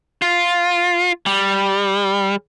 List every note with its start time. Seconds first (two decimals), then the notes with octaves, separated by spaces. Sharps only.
0.22 F4
1.26 G3